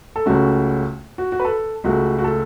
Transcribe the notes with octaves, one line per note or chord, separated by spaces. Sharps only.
A4
C#2 C#3 A3 C#4 F#4
F#4
F#4
B4
A4
C#2 C#3 A3 F#4
F#4
A4